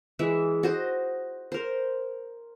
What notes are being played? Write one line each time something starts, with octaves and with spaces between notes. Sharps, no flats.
E3 G#3 E5
F#4 C5 D#5
A#4 C5